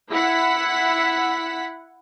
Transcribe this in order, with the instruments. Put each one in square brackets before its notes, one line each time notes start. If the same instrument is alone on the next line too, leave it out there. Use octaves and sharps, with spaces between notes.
[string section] E4 F#5 B6